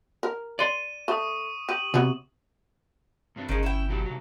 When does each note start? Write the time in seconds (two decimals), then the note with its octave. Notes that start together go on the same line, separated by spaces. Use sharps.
0.23 A#4
0.59 D5 C6 D#7
1.08 A3 C#6 D#6
1.69 G4 D#7 F#7
1.94 C3 F#3 B3 C#5
3.36 G2 C4 D4
3.49 G1 D#3 F3 G#3 C#4
3.63 E4 G5
3.89 B2 F#3 G4
4.05 C3 F#3